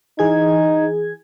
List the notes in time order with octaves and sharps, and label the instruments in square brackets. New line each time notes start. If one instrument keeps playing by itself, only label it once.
[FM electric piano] E3 G#4 G#6 [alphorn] D#4